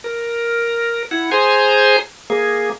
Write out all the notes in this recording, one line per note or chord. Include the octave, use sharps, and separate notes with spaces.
A#4
E4 F#5
G#4 C5 G#5 A#5 C6
A#3 G#4